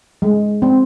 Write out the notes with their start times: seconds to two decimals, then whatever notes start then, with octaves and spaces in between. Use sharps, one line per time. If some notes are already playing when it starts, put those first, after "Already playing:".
0.22 G#3
0.62 C4